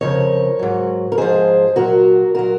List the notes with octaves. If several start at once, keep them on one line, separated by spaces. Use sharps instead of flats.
F2 C#3 F3 A#4 C#5
G#2 F#3
A#4
G#2 F3 G#4 C5
A#2 F#3 F#4 A#4
A#2 F#3 F#4 A#4